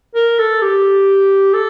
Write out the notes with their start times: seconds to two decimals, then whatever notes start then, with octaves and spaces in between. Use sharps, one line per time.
0.15 A#4
0.39 A4
0.62 G4
1.54 A4